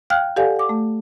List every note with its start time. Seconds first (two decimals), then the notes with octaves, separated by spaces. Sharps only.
0.10 F5 G5 F6 F#6 G#6
0.36 G4 A4 D5 F5 F#5 G#5
0.56 F#5 D6
0.69 A3